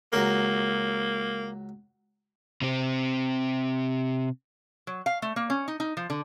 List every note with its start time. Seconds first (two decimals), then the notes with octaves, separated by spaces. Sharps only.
0.13 C#2 F#3 A#3 A#4
2.62 C3 C4
4.87 F#3
5.06 F5
5.22 A3
5.36 A#3
5.50 C#4
5.68 D#4
5.80 D#4
5.97 F3
6.10 D3